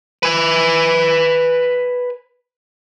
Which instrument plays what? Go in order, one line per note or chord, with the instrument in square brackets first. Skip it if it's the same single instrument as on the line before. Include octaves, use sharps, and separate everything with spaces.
[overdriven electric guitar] B4 G#5